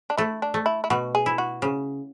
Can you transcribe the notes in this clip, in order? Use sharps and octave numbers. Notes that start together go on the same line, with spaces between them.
D4
A3 E4
D4
A3
E4
E4
B2 F#4
G#4
E4
F#4
C#3